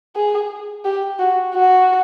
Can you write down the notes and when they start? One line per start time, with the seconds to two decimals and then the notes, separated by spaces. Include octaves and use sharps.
0.16 G#4
0.85 G4
1.19 F#4
1.54 F#4